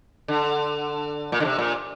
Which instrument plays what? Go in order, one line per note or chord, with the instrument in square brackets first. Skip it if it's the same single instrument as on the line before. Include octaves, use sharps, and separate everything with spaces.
[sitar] D3
A#2
D3
C3
A#2